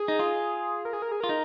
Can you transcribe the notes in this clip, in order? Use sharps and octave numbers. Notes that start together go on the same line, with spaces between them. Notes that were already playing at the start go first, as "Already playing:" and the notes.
Already playing: G#4
D#4
F4
A#4
G#4
A#4
G#4
F4 A#4
D#4